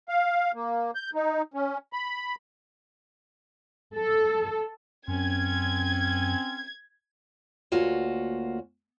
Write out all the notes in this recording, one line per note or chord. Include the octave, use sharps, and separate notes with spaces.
F5
A#3
G6
D#4
C#4
B5
A4
F#2 C4 C#4 G#6
D2 A#3 F4 F#4 C#5